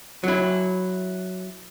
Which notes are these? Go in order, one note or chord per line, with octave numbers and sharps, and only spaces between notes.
F#3 E4